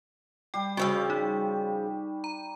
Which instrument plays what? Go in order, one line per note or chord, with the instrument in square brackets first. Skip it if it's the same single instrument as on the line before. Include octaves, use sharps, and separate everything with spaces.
[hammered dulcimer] G3 G4 [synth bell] G5
[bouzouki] C#3 E3 F3 [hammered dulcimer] G3 C#6 [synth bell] F#4 E6
[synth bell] D#4
A#5